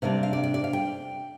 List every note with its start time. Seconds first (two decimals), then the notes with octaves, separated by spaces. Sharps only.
0.02 C3 G3 A#3 D4 F5
0.23 F5
0.33 D5
0.44 D5
0.54 D5
0.64 F5
0.73 G5